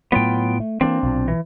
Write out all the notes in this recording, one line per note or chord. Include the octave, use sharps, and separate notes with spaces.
A2 F#3 B3 F4 G5
A3
E3 G#3 A#3 C4 D4
B1 A#2
E3